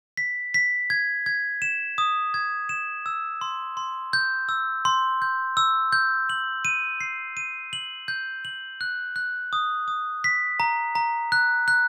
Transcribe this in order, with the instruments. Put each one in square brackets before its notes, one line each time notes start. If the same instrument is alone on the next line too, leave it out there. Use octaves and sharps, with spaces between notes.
[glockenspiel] B6
B6
G#6
G#6
E7
D#6
G#6
E7
E6
C6
C6
G6
E6
C6
G6
E6
G6
F#7
D#7
C7
D#7
F#7
G6
F#7
F#6
F#6
D#6
D#6
B6
A#5
A#5
F#6
F#6